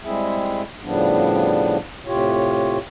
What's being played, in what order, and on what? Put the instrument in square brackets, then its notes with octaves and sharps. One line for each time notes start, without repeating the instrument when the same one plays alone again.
[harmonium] G3 G#3 C4 E4 G#4 E5
A2 C#3 F3 G3 B3 D4
A2 C3 F4 G4 C#5